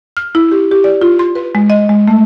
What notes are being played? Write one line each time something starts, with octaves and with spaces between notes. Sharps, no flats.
F6
E4
G4
G4
D5
F4
C6
B4
G#3
D#5
G#3
A3